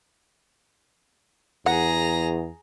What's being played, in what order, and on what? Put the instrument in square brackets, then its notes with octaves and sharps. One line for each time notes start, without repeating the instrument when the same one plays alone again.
[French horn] E2 [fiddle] G#4 A#5 [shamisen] F#5